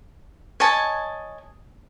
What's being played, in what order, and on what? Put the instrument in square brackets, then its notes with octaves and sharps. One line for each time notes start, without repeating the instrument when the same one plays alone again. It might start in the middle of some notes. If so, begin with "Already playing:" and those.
[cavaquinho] C#5 D#5 G#5 A5